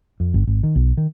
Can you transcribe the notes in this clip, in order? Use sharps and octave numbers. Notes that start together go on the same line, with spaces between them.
F2
G1
G#1
D#3
B1
D#3